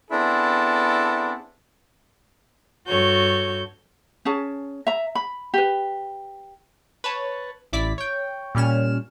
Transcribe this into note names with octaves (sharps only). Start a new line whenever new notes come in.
B3 C4 D4 E4 G#4 A4
G2 F#4 A4 C#5 G6
C#4 G#4 A5
E5 A#5
B5
G4 B4
B4 C#5 A5
A1 E4 D5 B6
C#5 G5
A#2 G3 C#4 F6 E7